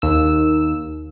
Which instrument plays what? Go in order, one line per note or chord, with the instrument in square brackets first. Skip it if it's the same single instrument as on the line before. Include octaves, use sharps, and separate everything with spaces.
[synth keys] D#2 E6